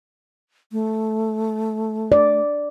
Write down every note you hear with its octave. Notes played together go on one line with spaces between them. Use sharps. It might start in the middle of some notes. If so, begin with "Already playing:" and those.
A3
D5